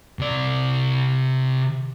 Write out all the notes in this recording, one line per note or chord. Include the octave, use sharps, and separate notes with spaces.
C3 D5